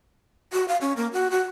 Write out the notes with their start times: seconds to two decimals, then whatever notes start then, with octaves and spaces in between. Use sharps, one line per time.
0.53 F#4
0.68 F5
0.81 C#4
0.97 A#3
1.13 F#4
1.31 F#4